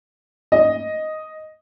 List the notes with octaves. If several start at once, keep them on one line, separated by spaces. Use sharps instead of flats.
D#5